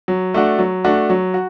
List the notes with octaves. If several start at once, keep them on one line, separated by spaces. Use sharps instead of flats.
F#3
A3 D4 F#4
F#3
A3 D4 F#4
F#3
F#4